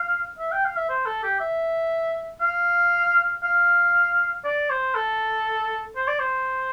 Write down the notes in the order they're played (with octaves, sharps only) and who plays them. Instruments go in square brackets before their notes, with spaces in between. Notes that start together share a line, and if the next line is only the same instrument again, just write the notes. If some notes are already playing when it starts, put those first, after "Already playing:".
Already playing: [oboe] F5
E5
G5
F5
E5
C5
A4
G4
E5
F5
F5
D5
C5
A4
C5
D5
C5